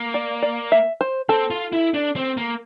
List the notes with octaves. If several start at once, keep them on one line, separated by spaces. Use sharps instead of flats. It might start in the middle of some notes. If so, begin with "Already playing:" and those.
Already playing: A#3
D5
D5
E5
C5
C4 A4
F4
E4
D4
C4
A#3